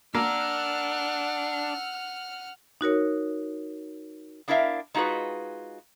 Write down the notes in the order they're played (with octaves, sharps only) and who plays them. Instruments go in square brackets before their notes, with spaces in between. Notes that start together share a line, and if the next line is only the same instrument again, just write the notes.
[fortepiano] A#3 [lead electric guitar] D4 [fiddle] F#5 F6 [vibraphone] E6
[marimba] D#4 F#4 A#4 C#5
[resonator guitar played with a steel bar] B3 D4 E4 A#4 E5 F5
G#3 D#4 F4 F#4 G#4 B4